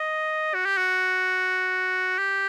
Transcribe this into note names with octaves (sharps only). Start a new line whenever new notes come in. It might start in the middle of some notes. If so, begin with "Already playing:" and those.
Already playing: D#5
F#4
G4
F#4
G4